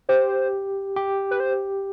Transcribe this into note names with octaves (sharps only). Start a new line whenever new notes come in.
G4 C5
G4
B4
C5